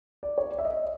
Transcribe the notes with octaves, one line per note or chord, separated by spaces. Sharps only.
D5
C#5
D5
E5
D#5